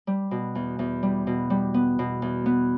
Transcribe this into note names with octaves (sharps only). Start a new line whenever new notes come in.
G3
B2
E2
E2
G3
B2
G3
B3
B2
E2
B3